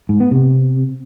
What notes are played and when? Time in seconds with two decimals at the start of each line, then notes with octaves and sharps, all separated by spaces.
0.09 G#2
0.20 B3
0.31 C3